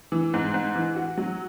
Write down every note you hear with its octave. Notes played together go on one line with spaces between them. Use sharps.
E3
G#2
G#2
E3
F#4
F#3